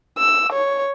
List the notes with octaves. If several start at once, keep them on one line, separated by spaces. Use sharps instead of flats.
E6
C#5